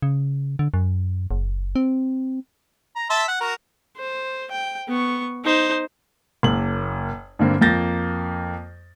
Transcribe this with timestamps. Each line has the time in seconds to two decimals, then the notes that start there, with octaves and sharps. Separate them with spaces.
0.02 C#3
0.59 D3
0.74 F#2
1.31 F#1
1.76 C4
2.96 A#5
3.10 E5 A5 C6
3.28 F#5
3.41 F#4 A#4
3.97 C5
4.51 G5
4.88 B3 C#6
5.44 D#4 C5
6.43 F#1 A#3 F#7
7.39 G2 D3 A#3 C4
7.61 F2 A#3 G6 A6 A#6